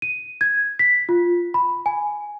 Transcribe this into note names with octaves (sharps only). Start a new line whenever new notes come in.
D#7
G#6
B6
F4
B5
G#5